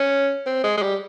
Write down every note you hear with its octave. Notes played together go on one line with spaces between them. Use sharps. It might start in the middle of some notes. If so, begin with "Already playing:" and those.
Already playing: C#4
C4
G#3
G#3
G3